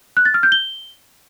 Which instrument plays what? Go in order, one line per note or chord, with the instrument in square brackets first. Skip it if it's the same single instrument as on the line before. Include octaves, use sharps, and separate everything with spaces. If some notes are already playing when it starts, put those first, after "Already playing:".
[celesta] F#6
A6
F6
G6
G7